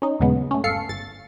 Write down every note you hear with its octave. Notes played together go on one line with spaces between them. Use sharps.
C#4 D#4
D#2 A#2 C#3 F#3 G#3 B3
A3 C#4
G1 A4 F5 C7 C#7
G1 A6